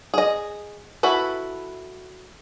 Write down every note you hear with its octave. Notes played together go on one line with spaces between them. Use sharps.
G#4 D#5
E4 F#4 A4 B4